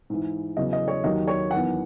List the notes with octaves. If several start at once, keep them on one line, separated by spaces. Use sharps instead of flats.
G#2 E3
E2 C#3 F#3 D#5
D#5
C#5
D#2 D#3 F#3 D#5
C#5
E2 D#3 F#3 F#5